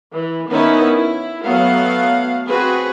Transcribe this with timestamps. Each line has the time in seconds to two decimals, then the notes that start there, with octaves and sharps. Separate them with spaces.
0.12 E3
0.49 D#3 B3 C#4 D#4 E4
0.95 E4
1.44 F#3 A3 B3 F5 F#5
2.48 C4 F#4 G#4 B4